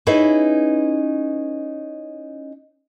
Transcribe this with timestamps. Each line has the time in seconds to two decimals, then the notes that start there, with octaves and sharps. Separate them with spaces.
0.07 C#4 D#4 E4 G#4 B4